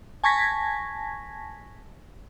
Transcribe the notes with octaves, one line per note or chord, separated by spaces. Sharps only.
G#5 A5 C#6 G#6 A#6 B6